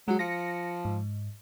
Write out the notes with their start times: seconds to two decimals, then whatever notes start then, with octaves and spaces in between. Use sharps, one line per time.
0.08 F#3 G#3 F#4
0.19 F3 A#6 C#7
0.85 G#2